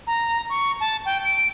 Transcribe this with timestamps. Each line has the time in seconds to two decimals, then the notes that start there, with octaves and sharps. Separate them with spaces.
0.07 A#5
0.50 C#6
0.80 A5
1.06 G5
1.25 D7